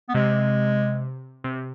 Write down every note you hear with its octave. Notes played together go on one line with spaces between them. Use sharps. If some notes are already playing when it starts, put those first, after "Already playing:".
B3
C3 G#3
C3